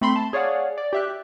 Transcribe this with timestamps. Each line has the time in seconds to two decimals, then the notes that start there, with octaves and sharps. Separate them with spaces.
0.01 A3 C4 B5 C6 C7
0.16 A5
0.33 G#4 C#5 D5 F5 F#5
0.78 D5
0.93 G4 E5 F#6